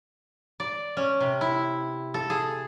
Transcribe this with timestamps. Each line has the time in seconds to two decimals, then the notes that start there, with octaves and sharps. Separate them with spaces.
0.60 D5
0.97 C#4
1.20 C3
1.41 E4
2.14 A4
2.30 G#4